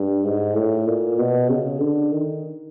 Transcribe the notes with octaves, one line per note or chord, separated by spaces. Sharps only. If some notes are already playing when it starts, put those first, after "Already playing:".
Already playing: G2
G#2
A2
A#2
B2
C#3
D3
D#3